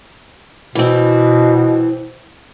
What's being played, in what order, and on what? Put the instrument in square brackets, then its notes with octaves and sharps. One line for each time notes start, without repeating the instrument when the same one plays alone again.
[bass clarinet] B2 [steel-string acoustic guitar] E3 C4